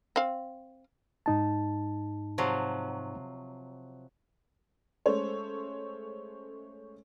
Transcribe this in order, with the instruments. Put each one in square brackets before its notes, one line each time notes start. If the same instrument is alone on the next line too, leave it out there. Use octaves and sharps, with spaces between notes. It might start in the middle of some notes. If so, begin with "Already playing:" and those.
[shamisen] C4 F5
[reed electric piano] G#2 D#4 A5
[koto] C3 F3 F#3
[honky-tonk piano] G#3 A3 C#4 A4 C5 C#5